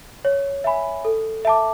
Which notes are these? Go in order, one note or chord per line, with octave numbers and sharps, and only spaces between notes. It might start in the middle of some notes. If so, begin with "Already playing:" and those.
C#5
E5 G#5 B5
A4
E5 A5 D6